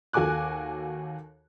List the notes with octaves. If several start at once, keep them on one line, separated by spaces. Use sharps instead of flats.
D#2 F#4 A4 G#5 D6 F#6